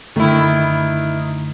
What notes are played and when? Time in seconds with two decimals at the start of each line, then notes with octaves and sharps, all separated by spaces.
0.16 F#2 D3 D#3 A3 E4